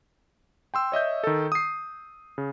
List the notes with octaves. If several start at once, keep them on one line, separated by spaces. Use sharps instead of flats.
G5 C6 E6
C#5 D#5 E5 G6
D#3 A4
D#6 C7
C#3